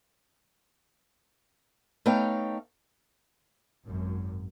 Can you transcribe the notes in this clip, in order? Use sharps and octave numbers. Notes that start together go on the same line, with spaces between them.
A3 B3 D#4 C#5 F5 G5
G#1 F#2